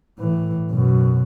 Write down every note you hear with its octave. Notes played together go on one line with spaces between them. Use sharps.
A2 E3
F#2 B2